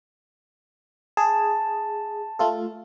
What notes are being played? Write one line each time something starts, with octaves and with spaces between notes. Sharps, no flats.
G#4 A5
A3 F4 A4